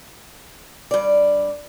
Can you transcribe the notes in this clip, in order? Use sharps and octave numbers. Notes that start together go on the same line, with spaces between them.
G2 D5